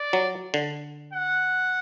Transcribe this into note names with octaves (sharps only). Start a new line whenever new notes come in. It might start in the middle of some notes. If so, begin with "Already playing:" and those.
Already playing: D5
F#3
D3
F#5